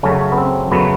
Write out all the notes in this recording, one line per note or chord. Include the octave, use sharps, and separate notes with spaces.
F#2 C#3 F#3 A3 C#4
B3
C4
F#2 C#3 F#3 A3 B3